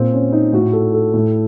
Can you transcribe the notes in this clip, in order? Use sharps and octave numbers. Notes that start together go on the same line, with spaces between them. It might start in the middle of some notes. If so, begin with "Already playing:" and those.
Already playing: A#2 C4
C#4
D#4
A2 F#4
A4
A4
A2